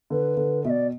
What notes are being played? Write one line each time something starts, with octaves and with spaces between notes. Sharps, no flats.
D3 B4
D3
B2 E5
D5